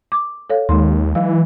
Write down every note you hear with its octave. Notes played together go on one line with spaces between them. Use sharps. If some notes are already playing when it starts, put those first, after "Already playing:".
D6
A4 C#5 F5
D#2 G#3 D#4 C6
E3 F#3 F5